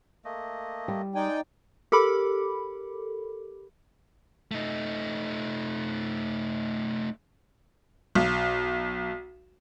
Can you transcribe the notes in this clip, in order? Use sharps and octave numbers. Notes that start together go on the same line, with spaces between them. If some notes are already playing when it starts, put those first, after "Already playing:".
A3 A#3 D#5
G3
G#3 D#4 D5 G5 G#5
G4 A4 A#4 B5 D6
A3 D#4
B1